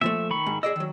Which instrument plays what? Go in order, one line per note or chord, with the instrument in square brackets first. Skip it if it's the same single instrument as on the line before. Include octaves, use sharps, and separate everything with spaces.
[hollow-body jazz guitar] A#2 F3 A3 [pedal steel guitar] E5
[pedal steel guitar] D#3 B5 C#6
[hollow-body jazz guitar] G#2
[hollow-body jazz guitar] G#4 D5 D#5 [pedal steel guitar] E6
[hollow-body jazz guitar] D#3 F#3